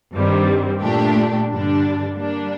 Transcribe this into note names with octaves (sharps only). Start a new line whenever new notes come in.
G2 D#3 G3 C4
A#2 A3 D4 G4
G2 D3 G3 D4
G3 A#3 D4